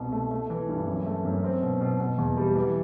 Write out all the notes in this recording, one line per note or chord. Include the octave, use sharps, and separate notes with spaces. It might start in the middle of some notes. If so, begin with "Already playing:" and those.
Already playing: C2 B2 B3
A3
A3
E3
G2
F#2
A3
F#2
C4
B2
B2
B2
E2
G3
E3